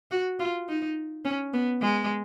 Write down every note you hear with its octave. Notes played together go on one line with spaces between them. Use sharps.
F#4
F4
D#4
C#4
B3
G#3